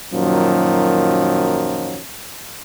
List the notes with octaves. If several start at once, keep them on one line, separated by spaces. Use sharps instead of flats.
F#2 A#2 D#3 F3 F#3